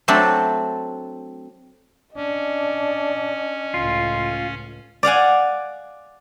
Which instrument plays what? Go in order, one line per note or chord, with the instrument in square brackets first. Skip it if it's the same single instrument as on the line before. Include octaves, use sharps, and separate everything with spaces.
[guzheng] F#3 A3 C4 D4 A4
[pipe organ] C#4 [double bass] D4 [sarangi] D#5
[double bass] C#2 A2 [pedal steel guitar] F4
[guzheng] D5 F5 F#5 G#5